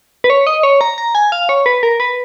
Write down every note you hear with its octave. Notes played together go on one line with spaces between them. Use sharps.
B4
C#5
D#5
C#5
A#5
A#5
G#5
F5
C#5
B4
A#4
B4